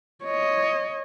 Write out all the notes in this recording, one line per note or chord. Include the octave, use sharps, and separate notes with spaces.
C#5 D#5